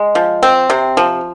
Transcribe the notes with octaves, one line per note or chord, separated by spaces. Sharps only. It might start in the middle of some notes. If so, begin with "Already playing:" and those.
Already playing: G#3
F3
C4
C3
F3